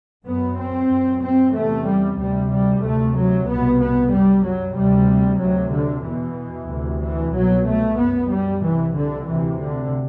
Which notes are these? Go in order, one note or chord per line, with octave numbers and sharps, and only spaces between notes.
F#2 B3
C4
F#2
C4
E2 C3 A3
G3
D2 C3 G3
G3
D2 C3 A3
F#3
C2 B2 B3
B3
F#2 G3
F#3
D2 C3 G3
D2 C3 F#3
D3
E2 B2 E3
D2 C3
E3
C2 B2 F#3
A3
F#2 B3
G3
C2 C3 E3
D3
D2 C3 E3
D3